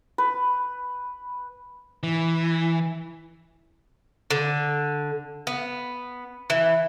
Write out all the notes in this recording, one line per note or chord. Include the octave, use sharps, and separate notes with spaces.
B4
E3
D3
B3
E3